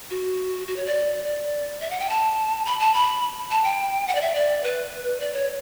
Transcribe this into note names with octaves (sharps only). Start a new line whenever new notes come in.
F#4
F#4
C#5
D5
D5
E5
F#5
G5
A5
B5
A5
B5
A5
G5
F#5
D5
E5
D5
B4
D5
C#5